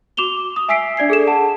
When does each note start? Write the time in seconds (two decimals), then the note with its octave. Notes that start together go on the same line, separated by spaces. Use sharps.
0.17 F#4 D6 E7 F7 G7
0.56 D#6
0.69 E5 G#5 E6 B6 C7 D7
0.97 D4 D5 G#6 C7
1.10 G#4 A4 E7
1.27 F#5 A5